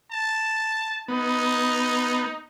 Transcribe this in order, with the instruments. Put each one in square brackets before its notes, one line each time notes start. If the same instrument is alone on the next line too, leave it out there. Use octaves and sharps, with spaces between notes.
[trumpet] A5
[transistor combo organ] B3 [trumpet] D#4